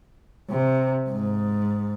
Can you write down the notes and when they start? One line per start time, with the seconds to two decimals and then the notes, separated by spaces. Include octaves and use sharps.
0.50 C3
1.09 G#2